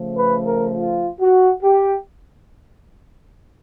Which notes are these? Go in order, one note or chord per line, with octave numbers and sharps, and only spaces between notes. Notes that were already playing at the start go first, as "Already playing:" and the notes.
Already playing: C#3 F3 A3
B4
A#4
F4
F#4
G4